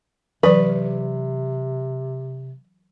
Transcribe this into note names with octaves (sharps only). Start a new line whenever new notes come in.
C3 E3 F#3 B4 D5